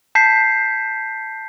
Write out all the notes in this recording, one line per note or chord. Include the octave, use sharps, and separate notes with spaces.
A5 G6 B6 C7